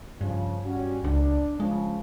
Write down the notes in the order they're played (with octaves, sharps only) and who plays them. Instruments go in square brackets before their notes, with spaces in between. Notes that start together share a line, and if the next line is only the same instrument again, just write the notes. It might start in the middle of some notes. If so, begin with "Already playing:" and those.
[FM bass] G2 [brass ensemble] C#3 F3
[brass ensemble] G3 C#4 F#4
[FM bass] C#2 [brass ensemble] D4
[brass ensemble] C#3 F3 [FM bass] G#3